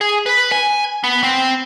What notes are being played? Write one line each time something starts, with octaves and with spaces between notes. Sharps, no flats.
G#4
B4
G#5
B3
C4